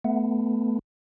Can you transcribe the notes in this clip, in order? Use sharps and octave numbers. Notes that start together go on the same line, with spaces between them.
A3 B3